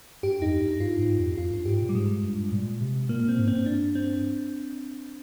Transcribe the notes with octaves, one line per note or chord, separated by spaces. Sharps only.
G2 G4
F2 D#4
G2 D#4
G2 F4
G#2
F2
F2 F4
G2
G#2 G4
A#2
G3
G#2 G#3
G2
G2
A#2
C3
A#2 A#3
A#2 C4
G#2
G2 C4
D4
C4